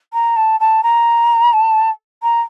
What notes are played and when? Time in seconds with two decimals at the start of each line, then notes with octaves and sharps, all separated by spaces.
0.13 A#5
0.36 A5
0.60 A5
0.83 A#5
1.53 A5
2.23 A#5